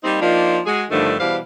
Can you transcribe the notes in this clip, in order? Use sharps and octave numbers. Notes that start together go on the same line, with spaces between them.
G3 A#3 C4 D#4
F3 A#3 D4 D#4 F4
G#3 F#4 G#4
G2 D3 D#3 F3 A3
B2 E3 G3 C5 F5